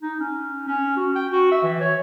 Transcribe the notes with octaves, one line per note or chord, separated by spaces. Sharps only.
D#4
C#4
C#4
F#4
G5
F#4
E5
E3
C#5